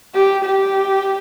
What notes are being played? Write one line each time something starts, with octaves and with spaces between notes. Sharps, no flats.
G4
G4